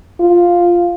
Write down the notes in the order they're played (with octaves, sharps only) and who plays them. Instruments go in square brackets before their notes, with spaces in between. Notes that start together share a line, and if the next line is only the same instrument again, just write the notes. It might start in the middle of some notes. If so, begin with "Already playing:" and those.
[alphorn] F4